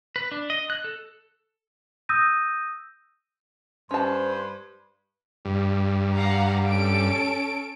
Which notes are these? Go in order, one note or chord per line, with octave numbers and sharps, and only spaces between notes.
B4
D4
D#5
F#6
A4
D#6 E6 G6 A#6 D#7
G2 C#4 C5 A5
G2
F5 F#5 A#5
C#4 A4 D7